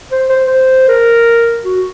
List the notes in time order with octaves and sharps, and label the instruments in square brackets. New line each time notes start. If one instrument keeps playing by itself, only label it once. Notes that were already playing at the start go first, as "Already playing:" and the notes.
[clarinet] C5
C5
C5
A#4
F#4